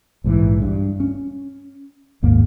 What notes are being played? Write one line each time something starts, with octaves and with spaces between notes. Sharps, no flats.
A#1 G#2 B2 E3
G2
C#4
G#1 D#2 G#2 A#3